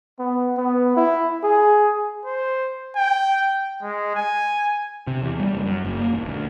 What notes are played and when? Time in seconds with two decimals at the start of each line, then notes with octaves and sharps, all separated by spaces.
0.19 B3
0.58 B3
0.97 E4
1.44 G#4
2.25 C5
2.96 G5
3.82 G#3
4.15 G#5
5.07 C3
5.22 E2
5.40 G3
5.53 F#1
5.66 F#2
5.85 F#1
6.00 A#3
6.13 D#1
6.26 D2